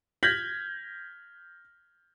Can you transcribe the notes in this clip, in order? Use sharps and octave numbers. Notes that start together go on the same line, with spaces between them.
F6 G6 G#6 A#6 B6 F#7